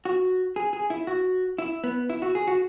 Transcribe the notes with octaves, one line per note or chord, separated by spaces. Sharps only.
F#4
G#4
G#4
E4
F#4
E4
B3
E4
F#4
G#4
F#4